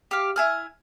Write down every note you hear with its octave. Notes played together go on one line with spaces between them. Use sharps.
G4 F5
E4 G#5 F6